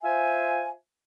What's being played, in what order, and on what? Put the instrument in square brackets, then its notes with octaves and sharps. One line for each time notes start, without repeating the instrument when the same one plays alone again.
[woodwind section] F4 C5 E5 G#5